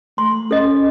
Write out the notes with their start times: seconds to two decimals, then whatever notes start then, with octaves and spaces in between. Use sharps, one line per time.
0.18 A3 C6
0.51 C#4 A4 D#5